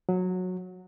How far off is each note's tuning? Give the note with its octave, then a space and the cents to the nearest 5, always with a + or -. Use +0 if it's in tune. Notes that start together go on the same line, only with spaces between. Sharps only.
F#3 -15